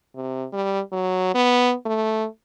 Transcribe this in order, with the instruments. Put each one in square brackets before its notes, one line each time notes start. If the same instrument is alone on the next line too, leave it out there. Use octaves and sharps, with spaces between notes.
[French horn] C3
G3
F#3
B3
A3